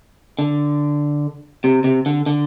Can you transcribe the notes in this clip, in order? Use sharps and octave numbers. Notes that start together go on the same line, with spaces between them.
D3
C3
C3
D3
D3